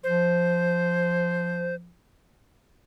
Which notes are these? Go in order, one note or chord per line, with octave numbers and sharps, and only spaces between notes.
F3 C5